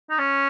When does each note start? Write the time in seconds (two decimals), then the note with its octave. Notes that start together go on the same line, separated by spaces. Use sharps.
0.10 D#4
0.19 C#4